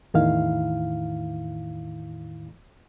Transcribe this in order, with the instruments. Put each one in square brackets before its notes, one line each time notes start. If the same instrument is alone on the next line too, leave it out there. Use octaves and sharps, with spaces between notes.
[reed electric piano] E2 A2 D#3 E4 F5